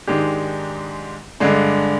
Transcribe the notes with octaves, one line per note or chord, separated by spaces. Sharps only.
G#2 D#3 G#3 D4 G4
G2 D3 G#3 D4